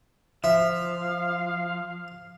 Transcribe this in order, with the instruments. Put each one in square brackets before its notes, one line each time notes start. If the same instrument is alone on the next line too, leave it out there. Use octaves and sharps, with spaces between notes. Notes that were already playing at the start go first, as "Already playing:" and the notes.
[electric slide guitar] F3 [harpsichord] E5 [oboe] F5